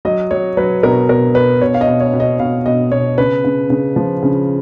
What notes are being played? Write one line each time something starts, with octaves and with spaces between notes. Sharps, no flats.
F#3 D#5
F#3 C#5
F#3 B4
B2 A#4
B2 A#4
B2 B4
B2 C#5
F5
D#5
B2
C#5
B2
D#5
B2 F5
B2 D#5
B2 C#5
C#3 B4
C#3
C#3
F3
C#3